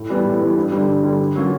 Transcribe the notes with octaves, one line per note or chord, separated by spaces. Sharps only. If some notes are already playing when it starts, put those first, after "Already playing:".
Already playing: A2
E3 G3 B3
A2
E3 G3 B3
G2
D3 G3
G2
D3 G3
D3
F#3 A#3 C#4 F4